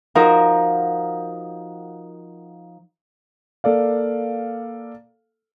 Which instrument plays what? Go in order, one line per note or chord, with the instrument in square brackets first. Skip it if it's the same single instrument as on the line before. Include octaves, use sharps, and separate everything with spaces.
[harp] F3 D#4 F#4 A#4
[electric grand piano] A#3 A4 D5 F5